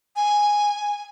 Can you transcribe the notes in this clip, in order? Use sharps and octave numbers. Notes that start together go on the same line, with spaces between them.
G#5